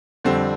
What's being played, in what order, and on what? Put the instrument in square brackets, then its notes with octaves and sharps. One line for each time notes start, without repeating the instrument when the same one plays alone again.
[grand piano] F2 D3 G3 C4